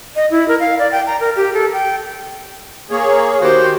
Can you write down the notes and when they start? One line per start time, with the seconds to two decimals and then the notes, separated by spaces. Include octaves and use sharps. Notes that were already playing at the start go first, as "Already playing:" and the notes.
0.16 D#5
0.31 E4
0.48 A#4
0.60 F5
0.79 D5
0.92 G5
1.06 A#5
1.20 A#4
1.36 G4
1.54 A4
1.73 G5
2.91 A#3 G#4 C#5
3.41 D#3 F#4 G4 C5